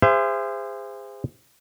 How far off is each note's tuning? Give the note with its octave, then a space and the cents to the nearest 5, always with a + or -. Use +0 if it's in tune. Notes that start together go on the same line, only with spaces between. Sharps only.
G#4 -35 C5 -20 E5 +35